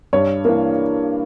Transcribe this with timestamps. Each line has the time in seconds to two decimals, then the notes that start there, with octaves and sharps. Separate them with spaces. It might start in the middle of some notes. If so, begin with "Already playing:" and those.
0.13 G2 C#5
0.45 E3 A#3